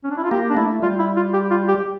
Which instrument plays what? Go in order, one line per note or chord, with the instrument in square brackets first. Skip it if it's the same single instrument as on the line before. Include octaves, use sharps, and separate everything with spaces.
[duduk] C#4
D4
E4
F4
[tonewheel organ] A#3 [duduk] G4
[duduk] D4
[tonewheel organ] A3 [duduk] E4
[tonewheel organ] G3 [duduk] F4
[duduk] E4
F4
G4
F4
G4